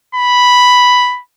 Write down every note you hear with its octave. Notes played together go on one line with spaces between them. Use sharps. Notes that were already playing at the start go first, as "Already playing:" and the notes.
B5